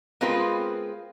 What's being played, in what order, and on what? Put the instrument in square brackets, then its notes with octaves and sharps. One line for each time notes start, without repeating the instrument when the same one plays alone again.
[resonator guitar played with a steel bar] G#3 B3 C4 F4 A#4 B4